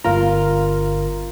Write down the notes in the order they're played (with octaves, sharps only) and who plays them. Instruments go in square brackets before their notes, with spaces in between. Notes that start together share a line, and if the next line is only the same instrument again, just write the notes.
[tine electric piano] G1 A#4 A#5 [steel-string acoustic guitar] F4